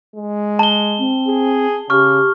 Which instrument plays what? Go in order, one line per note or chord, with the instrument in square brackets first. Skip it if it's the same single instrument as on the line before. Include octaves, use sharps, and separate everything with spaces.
[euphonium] G#3
[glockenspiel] A5 G7
[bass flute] C4
[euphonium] G#4
[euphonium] C#3 [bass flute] G4 [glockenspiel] C#6 F6